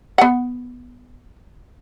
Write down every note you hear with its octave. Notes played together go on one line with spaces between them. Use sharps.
B3 F#5